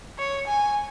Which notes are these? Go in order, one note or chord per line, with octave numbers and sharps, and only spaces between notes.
C#5
G#5